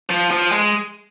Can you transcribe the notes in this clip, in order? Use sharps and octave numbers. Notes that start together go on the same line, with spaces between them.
F3
F3
G#3